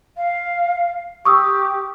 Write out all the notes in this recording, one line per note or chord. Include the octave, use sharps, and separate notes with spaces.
F5
G4 C#6 D#6 E6